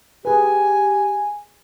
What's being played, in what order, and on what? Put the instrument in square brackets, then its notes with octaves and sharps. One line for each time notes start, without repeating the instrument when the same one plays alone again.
[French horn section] G4 [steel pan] G#4 B4 [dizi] G#5